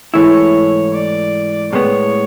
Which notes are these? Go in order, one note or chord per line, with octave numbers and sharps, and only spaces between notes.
G#2 E3 A3 E4 C#5
D5
A2 G#3 B3 C#5